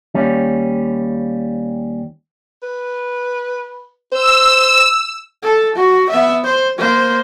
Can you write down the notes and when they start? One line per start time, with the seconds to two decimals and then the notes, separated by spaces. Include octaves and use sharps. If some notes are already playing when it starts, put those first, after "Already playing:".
0.14 D#2 G3 C#4
2.63 B4
4.12 C5 E6
5.43 A4
5.75 F#4
6.10 B3 E5
6.45 C5
6.79 A#3 C5